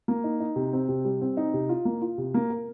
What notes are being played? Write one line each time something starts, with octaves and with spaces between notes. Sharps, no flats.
A#3
D#4
D#4
C3
C4
C3
G3
C4
D#4
C3
F4
A#3
F4
C3
A#3
A#4